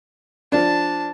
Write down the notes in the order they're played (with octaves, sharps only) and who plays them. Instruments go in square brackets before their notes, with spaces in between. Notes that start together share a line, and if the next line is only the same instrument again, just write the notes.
[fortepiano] F3 D4 [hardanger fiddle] A5